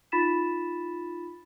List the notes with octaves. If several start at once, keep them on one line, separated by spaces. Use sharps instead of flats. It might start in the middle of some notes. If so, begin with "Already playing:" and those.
D#4 F4 B5 A6 B6 E7